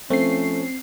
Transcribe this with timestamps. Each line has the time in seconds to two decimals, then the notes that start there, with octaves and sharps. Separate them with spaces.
0.10 F3 A3 C4 C#4 C7